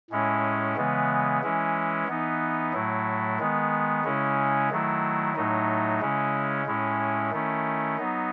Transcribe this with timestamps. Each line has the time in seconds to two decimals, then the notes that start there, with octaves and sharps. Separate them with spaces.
0.10 A2 G#3 C#4 E4
0.76 C#3 E3 G#3 B3
1.42 E3 G#3 C#4 E4
2.08 E3 B3 D#4
2.73 A2 F#3 A3 E4
3.39 D#3 G#3 B3
4.04 C#3 G#3 C#4 E4
4.70 D#3 F#3 A3 E4
5.35 A2 F#3 A3 D#4
6.01 C#3 G#3 C#4 E4
6.66 A2 G#3 C#4 E4
7.31 D#3 A3 C#4 E4
7.97 F#3 B3 D#4